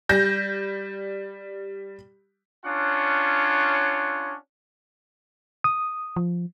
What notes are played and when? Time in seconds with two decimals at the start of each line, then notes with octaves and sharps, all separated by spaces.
0.09 G3 G6 A#6
2.65 C#4 D4 F4 C#5 F#5
5.64 D#6
6.16 F3